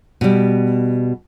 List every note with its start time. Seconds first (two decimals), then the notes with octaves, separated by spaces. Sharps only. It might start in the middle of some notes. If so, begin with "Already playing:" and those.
0.21 B2 G3